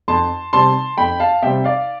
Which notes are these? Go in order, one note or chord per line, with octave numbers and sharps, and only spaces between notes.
F2 A5 C6
C3 G3 C4 A5 C6
F2 G5 B5
F5 A5
C3 G3 C4 E5 G5
D5 F5